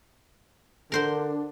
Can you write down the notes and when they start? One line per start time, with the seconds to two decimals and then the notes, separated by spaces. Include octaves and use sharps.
0.92 D3 D4 A#4 C5 C6